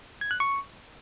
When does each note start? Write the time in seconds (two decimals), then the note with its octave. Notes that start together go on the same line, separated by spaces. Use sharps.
0.21 G#6
0.31 F#6
0.40 C#6